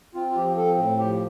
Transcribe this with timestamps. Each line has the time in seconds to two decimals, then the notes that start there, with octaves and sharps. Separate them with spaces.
0.15 C4 F4
0.30 F4
0.36 F3 G4
0.57 C4 A4
0.79 A2
0.99 F3 G4